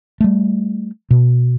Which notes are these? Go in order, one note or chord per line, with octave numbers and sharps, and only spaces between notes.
G3 A3
B2